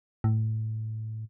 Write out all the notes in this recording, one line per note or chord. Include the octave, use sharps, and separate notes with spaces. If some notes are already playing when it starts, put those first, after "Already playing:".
A2